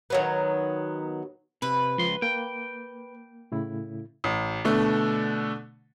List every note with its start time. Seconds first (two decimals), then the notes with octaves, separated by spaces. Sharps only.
0.10 D#3 F#3 B3
1.62 C3 B4
1.98 C#2 F3 C6
2.22 A#3 G5
3.52 A2 C#3 E4
4.24 A1
4.65 B2 D3 A3